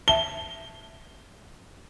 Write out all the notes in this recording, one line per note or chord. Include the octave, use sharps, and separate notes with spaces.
E5 A5 G7